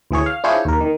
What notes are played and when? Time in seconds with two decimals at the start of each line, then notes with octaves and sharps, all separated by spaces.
0.11 D2 E3 G#4 C#5
0.26 F5
0.44 D4 E4 F4 G#4 C5 C#5
0.65 D#2 A#4
0.80 D#3